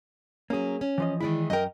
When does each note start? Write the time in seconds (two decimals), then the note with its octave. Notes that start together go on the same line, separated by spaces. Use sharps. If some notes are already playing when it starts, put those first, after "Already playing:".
0.50 F#3 A#3 C#4 G#4
0.81 C#4
0.98 E3 F3 D#5
1.21 D#3 E3 G#3 E4 D5
1.50 F#2 A#4 D#5 G5